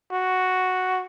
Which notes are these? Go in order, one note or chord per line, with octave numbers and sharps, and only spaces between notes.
F#4